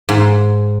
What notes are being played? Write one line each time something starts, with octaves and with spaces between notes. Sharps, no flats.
G#2